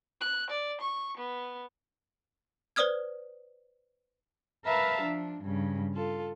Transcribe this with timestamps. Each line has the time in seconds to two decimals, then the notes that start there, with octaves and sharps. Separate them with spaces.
0.21 F#6
0.50 D5
0.81 C#6
1.18 B3
2.76 B4 C5 D5 D#6 F6 G#6
4.64 A#4 B4 E5 F5 A5 A#5
5.01 F3 D4
5.42 G2 C#3
5.95 F4 A4